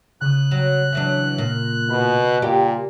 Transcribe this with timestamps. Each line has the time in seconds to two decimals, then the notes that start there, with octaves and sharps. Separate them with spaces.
0.21 C#3 D#6 F#6
0.51 F#3
0.93 E3 F#3 D4
1.38 A#2
1.90 B2 B5
2.42 A#2 G4